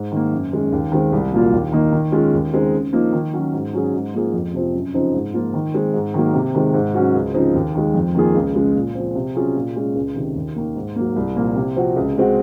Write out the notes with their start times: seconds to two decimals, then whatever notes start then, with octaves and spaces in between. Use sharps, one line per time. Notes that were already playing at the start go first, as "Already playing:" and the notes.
Already playing: G#2
0.12 D#3 A#3
0.32 F#2
0.52 D#3 G#3 C#4
0.72 D#2
0.92 D#3 G#3 C4
1.12 C2
1.32 A#2 F#3 A#3 F4
1.52 D#2
1.72 D#3 A#3 D#4
1.93 D#3
2.12 G#3 C#4 F4
2.33 D#2
2.53 C#3 G#3 C4 D#4
2.73 C#3
2.93 F3 A#3 D#4
3.13 D#3
3.33 F#3 C#4 F#4
3.53 G#2
3.73 F#3 C#4 G#4
3.93 G#2
4.14 F3 A#3 F4 G#4
4.33 F2
4.53 C3 F3 C4
4.74 F#2
4.94 C#3 F3 C4 D#4
5.14 G#2
5.34 F3 A#3 F4
5.54 D#3
5.74 G#3 C4
5.94 G#2
6.14 D#3 F#3 A#3
6.34 C3
6.55 D#3 G#3 C4
6.74 G#2
6.94 F#3 C#4 F#4
7.14 C#2
7.34 C#3 F3 C4 D#4
7.55 D#2
7.75 D#3 G#3
7.94 F2
8.15 D#3 A#3 F4 G#4
8.35 C#2
8.55 C#3 G#3
8.75 A#2
8.95 F3 C4
9.15 C3
9.35 F#3 C#4 F4 G#4
9.55 A#2
9.76 G#3 C#4
9.95 C#2
10.15 C3 D#3
10.35 D#2
10.56 D#3 A#3
10.76 G#2
10.96 F#3 A#3
11.16 C2
11.36 A#2 F3 A#3
11.56 C3
11.76 F3 C4 F#4
11.96 C#2
12.16 C#3 G#3 C4 F#4